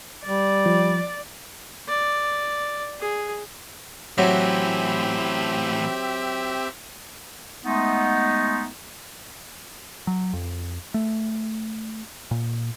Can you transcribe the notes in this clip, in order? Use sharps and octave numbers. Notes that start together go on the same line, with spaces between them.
G3 D5
F3
D5
G#4
A2 E3 F#3 C4 G4 E5
G#3 A3 B3 D#4
F#3
F2
A3
A#2